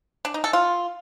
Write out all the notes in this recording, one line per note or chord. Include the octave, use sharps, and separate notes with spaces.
D4
D#4
A4
F4